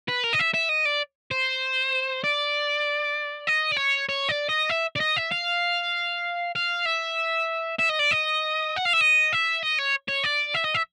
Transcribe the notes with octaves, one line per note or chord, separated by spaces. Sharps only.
B4
A#4
D#5
E5
E5
D#5
D5
C5
D5
D#5
D5
C#5
C#5
D5
D#5
E5
D5
D#5
E5
F5
F5
E5
E5
D#5
D5
D#5
F#5
F5
E5
D#5
E5
D#5
C#5
C#5
D5
E5
D#5
E5